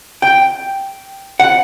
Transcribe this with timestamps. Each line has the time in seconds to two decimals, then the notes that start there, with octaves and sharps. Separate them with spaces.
0.22 G5
1.40 F#5